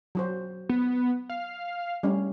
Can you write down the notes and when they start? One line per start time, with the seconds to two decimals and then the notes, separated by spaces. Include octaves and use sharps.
0.15 F#3 F#4 C5
0.69 B3
1.30 F5
2.03 G3 A3 C#4